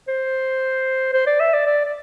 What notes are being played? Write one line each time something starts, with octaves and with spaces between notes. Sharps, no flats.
C5
C5
D5
E5
D5
D5
D5